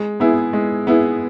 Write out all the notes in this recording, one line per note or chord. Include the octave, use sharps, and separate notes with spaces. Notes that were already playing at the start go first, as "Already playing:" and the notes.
Already playing: G#3
B3 E4 G#4
G#3
B3 E4 G#4